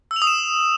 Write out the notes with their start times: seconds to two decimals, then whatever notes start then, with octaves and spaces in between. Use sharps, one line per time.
0.11 E6
0.16 F7
0.22 D#6
0.27 E7